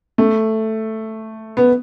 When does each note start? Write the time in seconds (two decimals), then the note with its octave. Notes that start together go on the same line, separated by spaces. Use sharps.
0.18 A3
1.57 B3